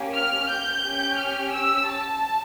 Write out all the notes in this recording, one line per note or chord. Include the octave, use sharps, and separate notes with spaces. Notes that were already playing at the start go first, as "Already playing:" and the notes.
Already playing: A#3 C#4 G4
F6
G6
C#4 G4
F6
E6
A5